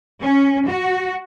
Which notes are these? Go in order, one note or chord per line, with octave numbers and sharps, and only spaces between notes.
C#4
F#4